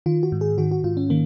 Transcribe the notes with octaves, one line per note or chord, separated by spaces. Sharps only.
D#3 F4
F#4
G#2
G#4
D#3 F#4
F#4
G#2 F4
C#4
D#3 A#3